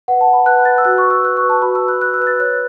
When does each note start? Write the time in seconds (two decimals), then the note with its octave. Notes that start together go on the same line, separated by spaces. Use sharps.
0.08 B4 F#5
0.21 A5
0.28 B4
0.33 B5
0.46 B4 F#6
0.65 B4 A6
0.78 E6
0.85 F#4 F#6
0.98 C#6
1.05 F#4
1.10 E6
1.24 B4 F#6
1.37 C#6
1.43 B4
1.49 A5
1.62 F#4 B5
1.75 E6
1.81 B4
1.88 F#6
2.01 B4 F#6
2.14 E6
2.20 B4 F#6
2.27 A6
2.40 C#5 F#6